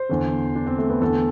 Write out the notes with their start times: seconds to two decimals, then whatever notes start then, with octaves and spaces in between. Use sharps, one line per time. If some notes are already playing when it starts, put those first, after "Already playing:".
Already playing: C5
0.09 E2 D3
0.55 D4
0.67 C4
0.79 A3
0.90 B3
1.01 E2 D3 A4